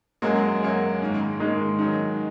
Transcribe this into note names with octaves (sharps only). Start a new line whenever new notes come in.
F#2 F#3 G#3 A#3 F#4
F#2 F#3 A#3 F#4
G#2 D#3 A#3
G#2 D#3 G#3 A#3
D#3 F#3 D#4